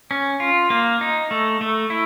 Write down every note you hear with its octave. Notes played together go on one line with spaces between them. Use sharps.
C#4
F4
A#3
D#4
A3
A3
E4